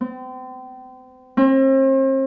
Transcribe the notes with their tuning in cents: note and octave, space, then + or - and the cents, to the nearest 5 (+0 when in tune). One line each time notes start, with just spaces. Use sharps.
C4 -35
C4 +40